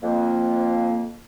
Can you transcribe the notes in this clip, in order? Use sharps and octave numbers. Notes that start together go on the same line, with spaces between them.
F2 A#3